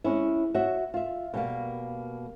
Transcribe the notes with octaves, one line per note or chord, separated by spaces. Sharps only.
G#3 C#4 E4
F#4 C#5 E5
F4 E5
B2 G3 A#3